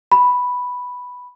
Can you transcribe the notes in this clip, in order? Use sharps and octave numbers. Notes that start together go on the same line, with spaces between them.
B5